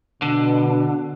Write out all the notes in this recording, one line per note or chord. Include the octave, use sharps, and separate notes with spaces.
B2 D3